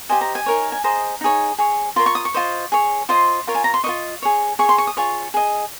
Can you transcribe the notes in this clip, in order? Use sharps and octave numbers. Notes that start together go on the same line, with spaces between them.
G4 C5 D#5 G#5
A#5
G#5
D#4 A#4 C#5
G#5
G#4 C5 D#5 A#5
D#4 G#4 C#5
G#4 C#5
F4 A#4 C#5 C6
C#6
D#6
C#6
F4 C5 D#5
G#4 C#5
F4 C5 D#5 C6
F4 A#4 C#5
G#5
A#5
C6
F4 C5 D#5 C#6
G#4 C#5
G#4 C#5 C#6
C6
C#6
D#6
F4 G#4 C#5 C#6
G#4 D#5